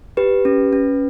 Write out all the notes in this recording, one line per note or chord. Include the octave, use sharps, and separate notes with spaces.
G4 B4
C#4
C#4